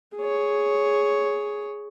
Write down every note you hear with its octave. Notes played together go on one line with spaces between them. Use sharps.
G#4 C#5